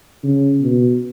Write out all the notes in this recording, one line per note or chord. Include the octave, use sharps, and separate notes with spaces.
C#3
B2